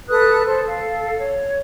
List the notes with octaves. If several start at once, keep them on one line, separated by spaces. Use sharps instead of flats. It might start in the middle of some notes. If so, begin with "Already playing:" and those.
A4 B4 D#6 F#6
A4 C5
A4 F5
C#5